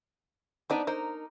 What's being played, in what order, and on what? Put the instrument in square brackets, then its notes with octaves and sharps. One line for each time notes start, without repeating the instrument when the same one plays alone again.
[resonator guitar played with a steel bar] B3 D4 D#4 [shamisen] C5 D5
[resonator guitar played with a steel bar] D#4 A#4 [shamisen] C5